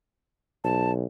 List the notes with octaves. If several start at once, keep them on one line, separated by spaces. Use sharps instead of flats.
B1 A5